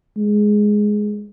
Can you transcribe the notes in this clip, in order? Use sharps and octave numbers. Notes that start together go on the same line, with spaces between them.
G#3